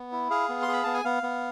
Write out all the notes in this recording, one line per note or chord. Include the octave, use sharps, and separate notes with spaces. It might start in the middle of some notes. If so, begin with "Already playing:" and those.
Already playing: B3
E4
G#4 F5
B3
C6
G#4
B5
B3 A5
G#5
B3 F5
B3